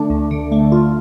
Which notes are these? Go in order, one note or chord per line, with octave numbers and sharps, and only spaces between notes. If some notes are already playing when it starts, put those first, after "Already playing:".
Already playing: D3 A3 D4
D2
D3
A3
F4